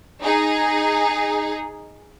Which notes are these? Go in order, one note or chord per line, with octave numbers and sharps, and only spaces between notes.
D#4 G#4